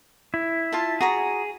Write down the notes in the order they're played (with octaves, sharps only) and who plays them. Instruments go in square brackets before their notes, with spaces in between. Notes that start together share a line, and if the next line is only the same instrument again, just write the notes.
[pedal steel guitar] E4
[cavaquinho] F4 F5 A5
[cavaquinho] F#4 A#5 D#6 [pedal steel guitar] G#4